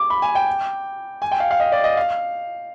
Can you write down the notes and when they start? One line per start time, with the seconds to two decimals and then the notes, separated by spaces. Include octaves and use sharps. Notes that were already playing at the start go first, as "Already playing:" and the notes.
Already playing: D6
0.10 B5
0.22 G#5
0.35 G5
1.22 G#5
1.31 G5
1.40 F5
1.51 F5
1.60 D#5
1.72 D5
1.84 D#5
1.97 F5